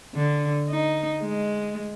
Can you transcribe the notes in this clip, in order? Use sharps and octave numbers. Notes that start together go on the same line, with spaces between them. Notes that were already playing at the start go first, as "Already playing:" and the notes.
D3
D#4
G#3